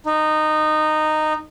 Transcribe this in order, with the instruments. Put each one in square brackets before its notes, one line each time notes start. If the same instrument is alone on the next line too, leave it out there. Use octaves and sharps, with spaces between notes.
[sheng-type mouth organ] D#4